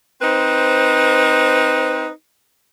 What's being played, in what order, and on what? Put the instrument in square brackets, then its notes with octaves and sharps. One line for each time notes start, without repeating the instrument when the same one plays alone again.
[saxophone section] C4 D#4 B4 C5